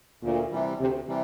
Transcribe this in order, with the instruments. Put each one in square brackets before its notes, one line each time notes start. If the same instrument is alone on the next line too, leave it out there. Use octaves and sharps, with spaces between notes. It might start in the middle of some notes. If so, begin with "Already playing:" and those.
[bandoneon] D2 [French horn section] A#2
[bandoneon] C3 E3 G3
[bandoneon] D2 [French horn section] C3
[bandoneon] C3 E3 G3